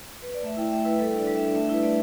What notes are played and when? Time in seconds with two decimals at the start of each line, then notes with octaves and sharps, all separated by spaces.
0.22 B4
0.34 D5
0.43 A3 E5
0.57 E4 G5
0.72 A3 E5
0.85 E4 B4
0.99 G3 A4
1.13 D4
1.18 D5
1.27 G3
1.36 D4 E5
1.49 D5
1.55 A3 E5
1.69 E4 B4
1.83 A3 D5